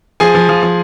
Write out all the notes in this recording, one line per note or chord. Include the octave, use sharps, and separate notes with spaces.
F3 G#4 G#5
F3
F3
F3